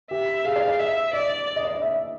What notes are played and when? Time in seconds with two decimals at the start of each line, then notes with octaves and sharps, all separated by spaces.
0.11 G4 E5
0.45 G#4 F5
0.56 D5
0.68 D5
0.79 D#5 E5
1.13 D5 D#5
1.56 D#5
1.65 D5
1.73 D#5
1.82 E5